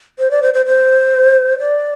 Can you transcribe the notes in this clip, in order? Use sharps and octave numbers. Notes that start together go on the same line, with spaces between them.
C5
D5
C5
C5
C5
D5